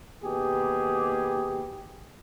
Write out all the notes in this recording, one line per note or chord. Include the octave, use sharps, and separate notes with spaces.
D#2 B2 G4 G#4